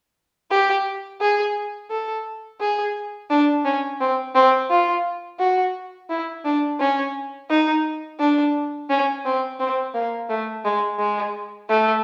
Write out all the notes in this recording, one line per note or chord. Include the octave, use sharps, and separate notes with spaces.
G4
G#4
A4
G#4
D4
C#4
C4
C4
F4
F#4
E4
D4
C#4
D#4
D4
C#4
C4
C4
A#3
A3
G#3
G#3
A3